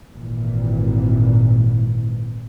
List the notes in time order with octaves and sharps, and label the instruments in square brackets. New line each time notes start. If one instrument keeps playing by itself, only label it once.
[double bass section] G#1 A#2 E3